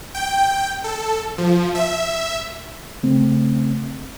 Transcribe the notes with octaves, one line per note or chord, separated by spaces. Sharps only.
G5
A4
F3
E5
C#3 A3 C4